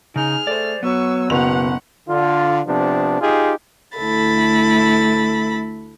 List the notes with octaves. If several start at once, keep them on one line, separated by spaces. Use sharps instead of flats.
C#3 D#4 G#4 F6
A3 C5 D5
F#3 B3 C#6 E6
F#1 B2 F#5 F7
D3 F4
C3 F3 B3 D4
D#4 F4 G4 G#4
D2 A3 E4 A4 B5 A6